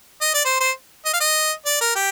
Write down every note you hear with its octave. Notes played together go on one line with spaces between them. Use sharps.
D#5
D5
C5
C5
D#5
F5
D#5
D5
A#4
G4